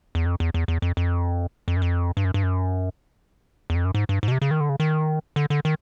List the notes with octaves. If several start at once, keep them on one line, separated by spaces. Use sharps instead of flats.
E2
F2
E2
E2
E2
F2
F2
F2
F#2
F2
G2
F#2
G2
F#2
E2
F2
F#2
G#2
G2
G#2
B2
C3
C#3
D#3
D3
C#3
D#3
D3
D3
D#3